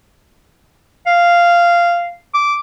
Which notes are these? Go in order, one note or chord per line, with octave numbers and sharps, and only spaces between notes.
F5
D6